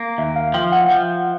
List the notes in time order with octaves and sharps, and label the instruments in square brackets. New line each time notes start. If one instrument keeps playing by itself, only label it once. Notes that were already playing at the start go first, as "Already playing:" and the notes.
Already playing: [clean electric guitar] A#3
[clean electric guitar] D#2 [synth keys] E5
[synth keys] F5
[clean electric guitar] F3 [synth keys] G5
[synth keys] F#5
[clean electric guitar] F3